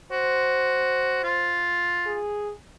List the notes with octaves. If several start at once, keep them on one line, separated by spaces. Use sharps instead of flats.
F#4 C5
F4
G#4